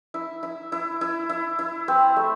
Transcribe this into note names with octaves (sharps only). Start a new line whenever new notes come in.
E4
E4
E4
E4
E4
E4
C4
A3